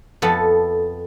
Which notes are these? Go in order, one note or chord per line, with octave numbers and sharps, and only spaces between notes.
F2 B3 A4